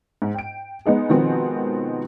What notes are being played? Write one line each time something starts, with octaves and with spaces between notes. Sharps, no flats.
G#2
G5 D7
G#3 B3 D#4 G#4
B2 D#3 F3 G#3 B3 C4